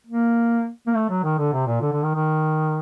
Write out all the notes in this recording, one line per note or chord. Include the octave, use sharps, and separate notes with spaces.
A#3
A#3
A3
F#3
D#3
D3
C3
A#2
D3
D3
D#3
D#3